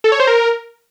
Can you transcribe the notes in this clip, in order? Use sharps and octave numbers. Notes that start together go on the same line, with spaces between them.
A4
C#5
C5
A#4